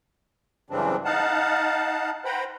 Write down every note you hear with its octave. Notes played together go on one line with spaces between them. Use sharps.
F#2 C#3 E3 G3 C4 D4
D#4 F5 F#5 A5
B4 C5 F#5 G5 A#5 B5